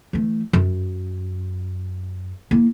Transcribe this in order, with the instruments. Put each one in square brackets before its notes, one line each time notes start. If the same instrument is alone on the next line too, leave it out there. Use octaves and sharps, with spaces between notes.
[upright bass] E3 A3
F#2
A#3 E4